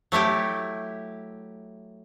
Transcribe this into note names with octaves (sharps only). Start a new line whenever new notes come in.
F#3 A3 E4 G4